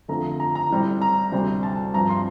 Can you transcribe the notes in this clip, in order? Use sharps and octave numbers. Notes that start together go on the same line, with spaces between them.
F2 D3 F3 A3 C4 A#5
A#5
A#5
A2 G3 C4
A#5
D2 C3 G3 C4
A5
G2 F3 C4 A#5
C6